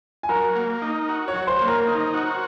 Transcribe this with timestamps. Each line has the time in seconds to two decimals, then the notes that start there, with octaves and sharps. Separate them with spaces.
0.23 G#5
0.29 F#3 A#4 A#5
0.55 A#3
0.82 D#4
1.09 F#4
1.28 C#5 C#6
1.34 F#3
1.47 C5 C6
1.61 A#3
1.68 A#4 A#5
1.87 D#4
2.14 F#4